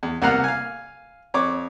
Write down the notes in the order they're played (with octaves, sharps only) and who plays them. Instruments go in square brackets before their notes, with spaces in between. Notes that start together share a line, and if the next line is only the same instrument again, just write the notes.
[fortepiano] E2
C2 A#3 B3 F#5 A#5 F6
F5 G#5
F2 C#5 D6